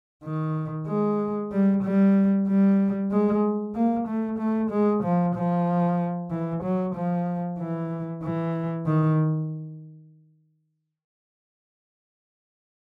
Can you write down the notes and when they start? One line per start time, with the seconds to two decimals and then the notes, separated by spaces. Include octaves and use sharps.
0.24 D#3
0.88 G#3
1.52 G3
1.83 G3
2.48 G3
3.11 G#3
3.75 A#3
4.07 A3
4.39 A3
4.71 G#3
5.03 F3
5.35 F3
6.31 E3
6.63 F#3
6.95 F3
7.59 E3
8.23 E3
8.86 D#3